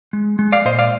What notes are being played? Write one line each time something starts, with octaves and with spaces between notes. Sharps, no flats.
G#3
G#3
D5 F5
A#2 C5 D#5
D5 F5